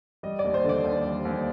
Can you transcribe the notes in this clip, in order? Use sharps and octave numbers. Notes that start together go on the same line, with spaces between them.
G3 D#5
D#2 D5
C5
D3
D5
D#2
G3
D#2